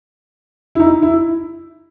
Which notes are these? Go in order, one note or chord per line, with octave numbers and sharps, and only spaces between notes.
E4
D#4
E4